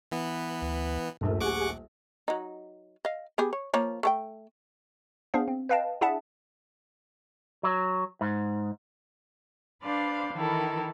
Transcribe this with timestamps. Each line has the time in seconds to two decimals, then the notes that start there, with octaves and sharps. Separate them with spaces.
0.12 E3 B3
0.62 D2
1.21 D#1 A#1 G2 A3 A#4
1.40 G4 G#4 F#5 G#5 C#6 D6
2.28 F#3 D#4
3.05 D#5 F5
3.38 B3 G4 G#4
3.53 C#5
3.74 F3 A#3 C#5
4.03 A3 A4 G5
5.34 B3 D4 G#4 C5 F5
5.48 C4
5.69 B4 D#5 F5 G5 A5
6.01 D4 E4 G#4 E5 F#5 A5
7.63 F#3
8.21 G#2
9.82 D4 B4 C5 D5 F5
10.35 D#3 E3 E4 A4 A#4